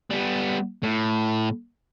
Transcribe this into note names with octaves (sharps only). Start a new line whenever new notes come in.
G3 B3
A2